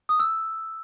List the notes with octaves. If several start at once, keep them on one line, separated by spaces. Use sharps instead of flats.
D#6
E6